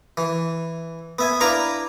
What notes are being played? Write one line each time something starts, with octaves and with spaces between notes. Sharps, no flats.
E3
B3 E5 G#5
D4 E4 B4 F5 A#5 D6